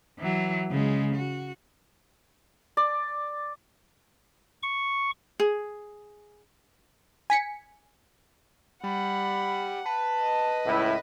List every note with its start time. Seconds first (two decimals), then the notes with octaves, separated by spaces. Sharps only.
0.19 E3 F#3
0.71 C#3 G#3
1.15 F#4
2.77 D5
4.63 C#6
5.40 G#4
7.30 G#5 B6 C#7
8.84 G3 F#5 B5
9.86 B4 A5
10.20 D#5
10.66 C#2 A2 E4